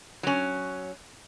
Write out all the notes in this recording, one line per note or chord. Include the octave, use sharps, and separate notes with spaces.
F#3 C#4